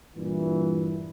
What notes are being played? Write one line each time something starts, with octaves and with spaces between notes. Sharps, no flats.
G2 A#2 E3